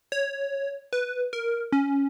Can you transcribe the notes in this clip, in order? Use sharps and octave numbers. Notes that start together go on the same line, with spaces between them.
C#5
B4
A#4
C#4